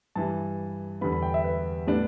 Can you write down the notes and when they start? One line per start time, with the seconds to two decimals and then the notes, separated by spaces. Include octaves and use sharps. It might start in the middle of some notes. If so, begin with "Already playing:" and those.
0.15 G2 E3 G3 A5
1.01 E2 D3 G3 B3 B5
1.12 B5
1.22 G5
1.34 E5
1.44 B4
1.87 A2 G3 B3 D4